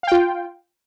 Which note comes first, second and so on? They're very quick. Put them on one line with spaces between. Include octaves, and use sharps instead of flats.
F5 G5 F4